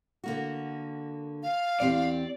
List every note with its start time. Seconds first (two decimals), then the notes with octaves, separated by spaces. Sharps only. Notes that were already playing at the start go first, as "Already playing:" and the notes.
0.24 D3 A#3 F#4
1.43 F5
1.80 E2 C4 G4 D5